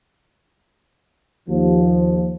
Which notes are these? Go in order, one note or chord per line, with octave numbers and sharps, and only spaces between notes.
D#2 F3